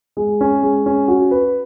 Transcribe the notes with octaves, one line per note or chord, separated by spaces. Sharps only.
G#3
C#4
G#3
C#4
F#4
B4